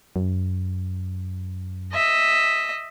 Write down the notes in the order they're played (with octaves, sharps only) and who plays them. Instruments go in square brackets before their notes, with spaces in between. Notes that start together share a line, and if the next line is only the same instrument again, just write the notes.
[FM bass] F#2
[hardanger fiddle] D#5 E5